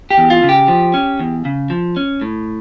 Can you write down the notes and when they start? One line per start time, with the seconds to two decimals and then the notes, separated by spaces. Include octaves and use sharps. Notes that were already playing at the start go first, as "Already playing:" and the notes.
0.10 G4
0.18 E2
0.30 F4
0.43 C#3
0.49 G4
0.68 F3
0.94 C#4
1.20 E2
1.45 C#3
1.70 F3
1.97 C#4
2.21 A2